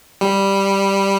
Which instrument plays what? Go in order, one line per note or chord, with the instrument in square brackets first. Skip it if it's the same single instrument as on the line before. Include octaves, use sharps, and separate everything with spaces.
[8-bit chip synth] G3